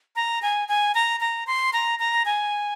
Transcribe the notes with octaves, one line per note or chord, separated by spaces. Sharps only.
A#5
G#5
G#5
A#5
A#5
C6
A#5
A#5
G#5